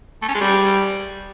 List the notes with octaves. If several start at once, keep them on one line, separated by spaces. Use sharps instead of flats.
A3
C#4
G#3
G3